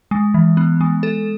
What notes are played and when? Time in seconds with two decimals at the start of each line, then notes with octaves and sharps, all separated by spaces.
0.11 G#3
0.34 E3
0.57 B3
0.81 G#3
1.03 A4